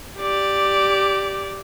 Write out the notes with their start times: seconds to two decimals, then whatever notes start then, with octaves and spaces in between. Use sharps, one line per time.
0.19 G4 D5